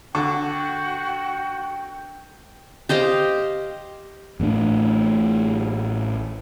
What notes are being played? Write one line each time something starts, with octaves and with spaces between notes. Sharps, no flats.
D3 F#4 G5 C#6
G4 C5 D#5 F5
A1 A2 C#3 D4